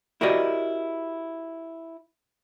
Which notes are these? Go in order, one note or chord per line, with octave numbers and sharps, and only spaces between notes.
E4 F#4 G4 A#4 D5 D#5